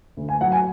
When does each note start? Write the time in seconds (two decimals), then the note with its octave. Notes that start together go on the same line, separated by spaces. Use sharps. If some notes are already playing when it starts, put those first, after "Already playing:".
0.17 D2
0.29 G#5
0.41 F#3 F#5
0.52 G#5